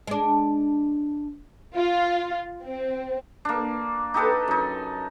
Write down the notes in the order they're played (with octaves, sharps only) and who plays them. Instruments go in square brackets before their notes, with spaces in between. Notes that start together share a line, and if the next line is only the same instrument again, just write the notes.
[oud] G#3 D4
[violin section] F4
C4
[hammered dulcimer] A#3 D4
D#4 G4 A4 B4
F#2 D#4